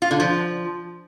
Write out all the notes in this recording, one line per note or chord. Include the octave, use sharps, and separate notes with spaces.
F4
D3
F3